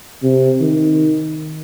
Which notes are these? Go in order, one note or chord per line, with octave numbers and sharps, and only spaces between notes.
C3
D#3